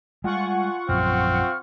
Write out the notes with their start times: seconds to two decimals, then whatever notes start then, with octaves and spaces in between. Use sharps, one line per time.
0.24 G3 G#3 F4 F#5 G#5 C#6
0.89 A#1 F#2 C4 F6